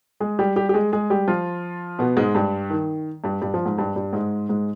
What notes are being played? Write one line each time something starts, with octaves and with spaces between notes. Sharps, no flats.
G#3 G#4
G3 G4
G3 G4
G4
G#3 G#4
G#3 G#4
G3 G4
F3 F4
B2 B3
G#2 G#3
G2 G3
D#3
G2 G3
G2 G3
F3
G#2 G#3
G2 G3
G2 G3
G#2 G#3
G#2 G#3